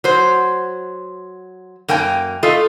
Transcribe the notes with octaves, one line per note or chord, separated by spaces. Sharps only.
F#3 C5
F#2 A#3 G5 G#5
A3 F4 A4 D#5